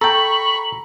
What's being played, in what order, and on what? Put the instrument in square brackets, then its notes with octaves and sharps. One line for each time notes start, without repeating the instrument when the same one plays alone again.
[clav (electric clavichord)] A4 G5 [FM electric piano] A#5 [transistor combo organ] B5 C#6 [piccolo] F#7